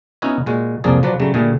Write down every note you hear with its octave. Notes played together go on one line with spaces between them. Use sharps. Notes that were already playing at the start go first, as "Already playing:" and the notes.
B3 C#4 D#4 E4 F#4 C#5
A#2 G#3 F#4
C2 F2 F3 A#3 G#4 D5
F3 F#3 B4 D5
C#3 F#3 G3 A3
A#2 D3 G3 A3 G#4